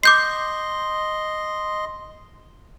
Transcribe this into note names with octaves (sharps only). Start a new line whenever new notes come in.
D#5 C6 D6 G6 C7